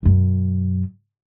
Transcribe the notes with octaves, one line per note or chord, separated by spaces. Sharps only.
F#2 B2